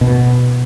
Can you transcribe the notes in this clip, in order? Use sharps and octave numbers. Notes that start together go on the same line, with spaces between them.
B2